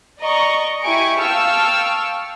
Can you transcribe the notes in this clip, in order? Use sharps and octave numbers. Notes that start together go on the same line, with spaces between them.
D5 D#5 A#5 C#6
E4 G4 G#5 C#6 D7
F5 G5 A5 C#6 E6 F6